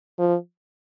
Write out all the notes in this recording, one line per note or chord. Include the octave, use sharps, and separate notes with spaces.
F3